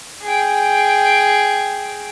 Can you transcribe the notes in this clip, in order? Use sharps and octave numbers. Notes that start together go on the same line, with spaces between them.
G#4 G5